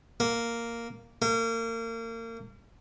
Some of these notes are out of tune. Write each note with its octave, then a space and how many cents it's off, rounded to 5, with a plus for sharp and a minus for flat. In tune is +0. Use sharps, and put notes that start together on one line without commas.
A#3 -5
A#3 -35